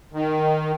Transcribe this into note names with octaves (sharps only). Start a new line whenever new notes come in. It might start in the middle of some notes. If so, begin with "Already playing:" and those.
D#3